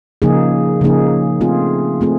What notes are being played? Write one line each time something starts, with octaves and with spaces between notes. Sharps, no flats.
C#3 F3 A#3 D#4 G#4
C#3 F3 A#3 D#4 G#4
A3 C4 F4 G#4
A3 C4 F4 G#4